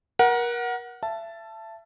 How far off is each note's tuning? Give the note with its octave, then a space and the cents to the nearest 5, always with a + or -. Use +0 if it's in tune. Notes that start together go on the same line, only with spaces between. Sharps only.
A#4 +30 F#5 +0
E5 +30 A5 +0